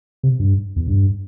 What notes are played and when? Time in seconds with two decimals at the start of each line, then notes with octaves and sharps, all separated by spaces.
0.23 C3
0.40 G2
0.76 E2
0.88 G2